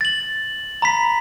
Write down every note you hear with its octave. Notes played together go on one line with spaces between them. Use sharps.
A6 F#7
A#5 B5 B6